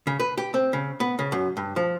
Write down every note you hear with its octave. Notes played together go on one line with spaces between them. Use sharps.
C#3
B4
G4
C4
C#3
B3
C#3
F#2
G2
F3